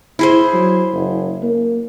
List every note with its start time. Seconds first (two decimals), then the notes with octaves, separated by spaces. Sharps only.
0.19 E4 G#4 C5
0.53 F#3
0.93 F#1
1.43 A#3